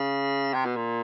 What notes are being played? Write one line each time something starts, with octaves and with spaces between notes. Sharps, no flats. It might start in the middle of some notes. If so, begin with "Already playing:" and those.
Already playing: C#3
C3
B2
A#2